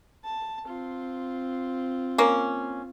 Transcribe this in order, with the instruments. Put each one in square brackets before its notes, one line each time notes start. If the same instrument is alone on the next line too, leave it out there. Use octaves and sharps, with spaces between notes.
[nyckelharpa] A5
C4 F4
[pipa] A#3 C#4